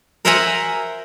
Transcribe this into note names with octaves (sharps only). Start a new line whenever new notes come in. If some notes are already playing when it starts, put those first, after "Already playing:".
A#4 C5 E5 F#5 G#5 A#5